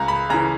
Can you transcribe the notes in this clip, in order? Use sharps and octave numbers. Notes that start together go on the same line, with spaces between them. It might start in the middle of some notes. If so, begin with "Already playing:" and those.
Already playing: C#2 A#5
B5
C#3 E3 A#5